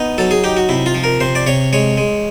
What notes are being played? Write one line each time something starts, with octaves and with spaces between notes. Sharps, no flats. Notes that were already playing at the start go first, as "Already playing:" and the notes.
Already playing: B3 D#4
F#3 A4
G#4
D#4 G4
F#4
C3 E4
F4
F3
A#4
C3 C5
D5
C3 C#5
G#3 C#5
G#3